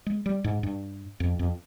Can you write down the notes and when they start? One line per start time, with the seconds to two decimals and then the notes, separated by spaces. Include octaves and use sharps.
0.06 G#3
0.26 G3
0.44 G#2
0.63 G2
1.20 F2
1.39 F2